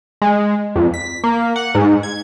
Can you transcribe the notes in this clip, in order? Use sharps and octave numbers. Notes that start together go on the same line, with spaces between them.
G#3
F2
B6
A#3
F#5
G#2
G#6